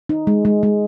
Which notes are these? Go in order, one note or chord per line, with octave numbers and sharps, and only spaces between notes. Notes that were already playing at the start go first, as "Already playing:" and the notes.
D#4
G#3
G#3
G#3